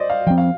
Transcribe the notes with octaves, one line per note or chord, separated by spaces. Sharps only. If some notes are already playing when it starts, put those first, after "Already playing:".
Already playing: C5 D5 D#5
F5
F3 C4 G5
F5